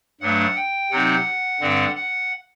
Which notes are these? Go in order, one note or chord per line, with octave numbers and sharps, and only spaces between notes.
G2 F#3 A3 D4 F#5
G5
C3 F#3 C4 D#4 F#5
G2 D3 G3 C4
F#5